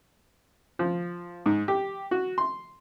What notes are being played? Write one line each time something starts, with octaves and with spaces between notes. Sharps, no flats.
F3
G#2
G4
F#4
C6